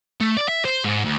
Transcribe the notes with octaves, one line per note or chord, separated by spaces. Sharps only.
A3
D5
E5
C5
G#2
D2